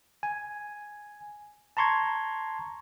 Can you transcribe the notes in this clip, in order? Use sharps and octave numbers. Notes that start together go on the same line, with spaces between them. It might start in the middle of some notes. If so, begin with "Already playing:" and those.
G#5
A5 A#5 C6 C#6 G#6